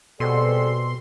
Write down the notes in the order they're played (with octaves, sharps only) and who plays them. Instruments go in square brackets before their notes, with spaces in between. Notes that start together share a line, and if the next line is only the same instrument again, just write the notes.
[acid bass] B2 [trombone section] G3 G#3 C4 [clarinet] A4 [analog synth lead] C6